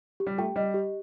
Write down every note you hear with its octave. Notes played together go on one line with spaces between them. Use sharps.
G4
G3
A3 G5
G3 D#5
G4